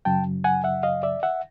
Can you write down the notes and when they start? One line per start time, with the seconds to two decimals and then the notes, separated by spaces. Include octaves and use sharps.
0.05 F#2 C#3 F#3 G5 A5
0.44 F#5 G#5
0.64 E5 F#5
0.83 D#5 F5
1.03 D5 E5
1.23 E5 F#5